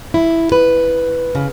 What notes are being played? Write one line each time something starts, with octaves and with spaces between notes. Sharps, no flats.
E4
B4
C#3